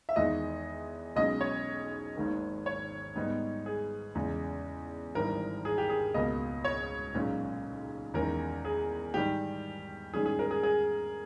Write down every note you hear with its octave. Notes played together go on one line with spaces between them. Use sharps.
E5
E2 D#3 G#3 B3 D#4 D#5
B1 B2 G#3 C#4 D#5
C#5
G#1 G#2 D#3 A#3
C#5
G#2 G3 B3 D#4
G#4
E2 C#3 G#3
G#1 G2 E3 G3 A#4
G#4
G4
G#4
C#2 B2 A#3 D#5
C#5
B1 A#2 G#3 C#4
E2 D#3 G#3 C#4 A#4
G#4
G#2 D#3 G3 G4
G#2 D#3 G3 C#4 G#4
G#4
A#4
G#4
G#4